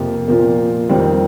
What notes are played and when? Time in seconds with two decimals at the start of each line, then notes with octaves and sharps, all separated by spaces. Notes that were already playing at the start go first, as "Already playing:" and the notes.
Already playing: F2 C3 F3 A#3
0.28 A#2 F3 A#3
0.89 F2 D#3 G3 C4